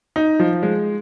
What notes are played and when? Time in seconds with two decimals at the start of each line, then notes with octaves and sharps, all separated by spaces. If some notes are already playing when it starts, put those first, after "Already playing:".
0.16 D#4
0.39 F3
0.63 G#3